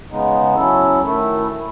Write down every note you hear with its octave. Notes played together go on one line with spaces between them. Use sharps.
C#3 G#3 B3 D#4
F#3 C#4 E4 A4
D#3 A3 E4 A4